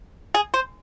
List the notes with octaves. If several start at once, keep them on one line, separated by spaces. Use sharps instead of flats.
G#4
C5